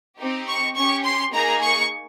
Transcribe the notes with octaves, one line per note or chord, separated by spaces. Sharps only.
C4 D#4 G4
C#6
C#4 G4 C#6
C6
A#3 D#4 G#4 A#5
C#6